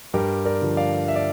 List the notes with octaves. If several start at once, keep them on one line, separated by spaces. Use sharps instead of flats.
G2 G4 A#4
A#4 D5
D3 F3
D5 F5
E5
D5